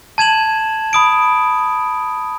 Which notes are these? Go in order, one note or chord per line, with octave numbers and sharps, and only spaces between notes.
A5 G#6 E7 F#7
B5 D#6 D7